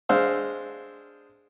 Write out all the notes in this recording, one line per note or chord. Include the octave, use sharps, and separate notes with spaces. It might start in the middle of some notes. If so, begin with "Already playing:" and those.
G#3 D4 C5 F5 E6